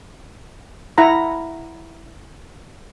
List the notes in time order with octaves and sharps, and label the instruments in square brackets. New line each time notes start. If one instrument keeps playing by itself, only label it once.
[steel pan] E4 F#5 A#5 B5